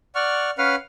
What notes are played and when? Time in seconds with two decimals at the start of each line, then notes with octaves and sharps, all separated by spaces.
0.15 D5 F#5 C#6 F6
0.58 C#4 B4 F5 F#5 F6